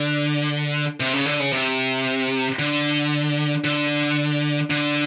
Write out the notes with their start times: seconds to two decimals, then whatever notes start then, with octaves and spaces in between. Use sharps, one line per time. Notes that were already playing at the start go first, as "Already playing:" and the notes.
Already playing: D3
1.00 C3
1.13 C#3
1.26 D3
1.40 C#3
1.53 C3
2.59 D3
3.64 D3
4.70 D3